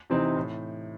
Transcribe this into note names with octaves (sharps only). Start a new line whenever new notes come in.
C3 E3 C4 D#4
A2